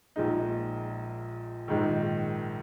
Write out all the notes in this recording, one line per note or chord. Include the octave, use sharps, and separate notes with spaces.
A#1 A#2 G#3 D#4
A#1 G#2 D#3